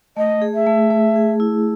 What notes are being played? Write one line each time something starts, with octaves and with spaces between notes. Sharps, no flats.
A3 D#5
G#4
E5
A3
A3
G#4
E4